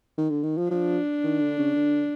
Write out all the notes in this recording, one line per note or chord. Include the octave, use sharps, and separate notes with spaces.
D#3
D3
D#3
F3
F3 D4
D#3
D3
C#3
D3